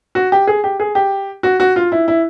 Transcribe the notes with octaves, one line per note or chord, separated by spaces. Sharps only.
F#4
G4
G#4
G4
G#4
G4
F#4
F#4
F4
E4
E4